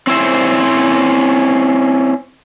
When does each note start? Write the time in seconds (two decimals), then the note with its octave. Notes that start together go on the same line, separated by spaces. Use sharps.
0.07 C4 C#4 E4 C5